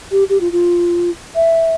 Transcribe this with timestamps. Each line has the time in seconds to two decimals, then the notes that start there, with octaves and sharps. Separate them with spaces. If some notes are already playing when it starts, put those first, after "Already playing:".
0.11 G4
0.29 G4
0.41 F4
0.52 F4
1.35 E5